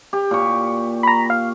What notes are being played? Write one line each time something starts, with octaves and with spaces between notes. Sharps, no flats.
G4
A#2 C#6
A#5 B5
F5